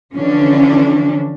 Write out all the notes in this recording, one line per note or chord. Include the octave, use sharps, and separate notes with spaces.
D3 E3 F3 C#4 D4